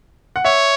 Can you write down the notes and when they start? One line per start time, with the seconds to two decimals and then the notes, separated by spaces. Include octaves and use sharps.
0.36 F#5
0.45 C#5 E5